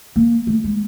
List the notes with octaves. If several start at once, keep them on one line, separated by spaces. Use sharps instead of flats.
A#3
A3
G#3